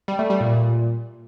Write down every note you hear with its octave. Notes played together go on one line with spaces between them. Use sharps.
G3
A3
G3
A#2